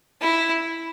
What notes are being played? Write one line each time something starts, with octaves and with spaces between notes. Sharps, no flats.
E4